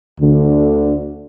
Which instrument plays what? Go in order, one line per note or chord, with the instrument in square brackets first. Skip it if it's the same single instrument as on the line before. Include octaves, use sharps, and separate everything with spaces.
[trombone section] D2 D3